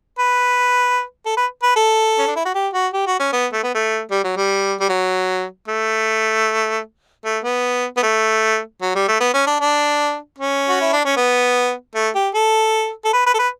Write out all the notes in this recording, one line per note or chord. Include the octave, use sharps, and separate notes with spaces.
B4
A4
B4
B4
A4
C#4
D4
E4
F#4
G4
F#4
G4
F#4
C#4
B3
A3
B3
A3
G3
F#3
G3
G3
F#3
A3
A3
B3
B3
A3
F#3
G3
A3
B3
C#4
D4
D4
C#4
F#4
E4
D4
C#4
B3
A3
G4
A4
A4
B4
B4
A4
B4